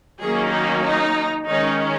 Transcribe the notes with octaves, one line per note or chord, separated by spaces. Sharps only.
D#3 F#3 A#3 C#4 G#4
D#4
D#4
D#3 G#3 C#4 D#4